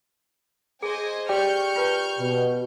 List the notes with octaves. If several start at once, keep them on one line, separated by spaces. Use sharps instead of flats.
G#4 C5 D#5 G#5
G4 D5 G5 C#6 F6 G6
F4 B4 A5
B2